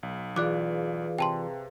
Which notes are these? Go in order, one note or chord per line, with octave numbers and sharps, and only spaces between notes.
B1
E3 F4 G#4 B4 D5 F5 D6 F#6
C3 G5 A5 C6